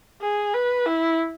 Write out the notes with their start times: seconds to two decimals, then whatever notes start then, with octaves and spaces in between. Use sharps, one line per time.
0.21 G#4
0.54 B4
0.86 E4